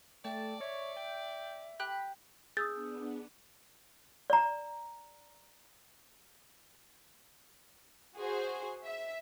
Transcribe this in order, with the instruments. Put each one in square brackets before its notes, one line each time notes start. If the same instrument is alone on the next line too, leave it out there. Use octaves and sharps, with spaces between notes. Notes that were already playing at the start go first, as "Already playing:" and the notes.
[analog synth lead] A3 [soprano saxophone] D5 [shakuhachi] G5 [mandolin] A5
[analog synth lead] C#5 [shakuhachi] E5
[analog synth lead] G5
[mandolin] G4 F#6 [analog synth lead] B5
[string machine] B3 D4 [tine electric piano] G#4 [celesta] D#6 E6 G6 [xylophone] A6
[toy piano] D5 A#5
[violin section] F#4 G#4 C5
E5